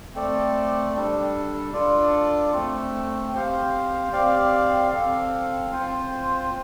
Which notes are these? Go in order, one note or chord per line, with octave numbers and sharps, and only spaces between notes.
A3 C4 A4 D5
G3 D4 A4
D4 F4 A4 D5
A3 C4 A4
C4 G4 C5 F5
C4 G4 D5 F5
C4 A4 F5
C4 F4 C5